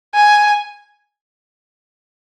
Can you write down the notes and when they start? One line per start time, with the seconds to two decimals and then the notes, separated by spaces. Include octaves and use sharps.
0.14 G#5